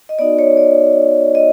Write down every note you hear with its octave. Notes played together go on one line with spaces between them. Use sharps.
D#5
B3 D#4 F#4 D5
C#5
D5
D#5